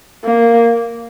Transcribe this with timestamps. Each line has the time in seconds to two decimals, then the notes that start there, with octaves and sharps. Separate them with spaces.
0.24 A#3